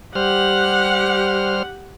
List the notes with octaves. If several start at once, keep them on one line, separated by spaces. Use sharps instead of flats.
G3 G4 C5 F#5 F6